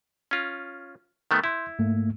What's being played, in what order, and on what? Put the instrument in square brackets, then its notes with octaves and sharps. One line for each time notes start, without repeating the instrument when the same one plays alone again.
[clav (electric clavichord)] C#4 F4
D#3 A3 B3
[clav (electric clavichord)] E4 [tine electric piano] C6 G6
[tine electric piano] G#2 A3 A#3